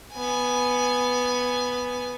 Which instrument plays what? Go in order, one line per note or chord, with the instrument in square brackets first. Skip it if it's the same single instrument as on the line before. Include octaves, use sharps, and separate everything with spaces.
[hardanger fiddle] B3 G#5